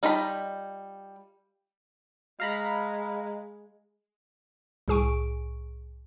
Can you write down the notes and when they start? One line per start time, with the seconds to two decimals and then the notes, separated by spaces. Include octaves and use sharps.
0.03 G3 D#4 F4 A5 B5
2.40 G#3 F5 A#5 B5
4.88 C2 A2 G#4 G#5 C#6 D7